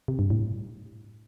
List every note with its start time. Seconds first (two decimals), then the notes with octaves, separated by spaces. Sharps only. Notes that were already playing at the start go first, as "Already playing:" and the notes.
0.08 C3
0.19 G2
0.30 A2